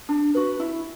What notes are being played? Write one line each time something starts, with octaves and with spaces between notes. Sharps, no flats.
D4
F#4 B4
E4